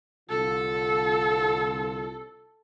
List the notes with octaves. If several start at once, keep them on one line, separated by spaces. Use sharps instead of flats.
C2 D3 F4 A4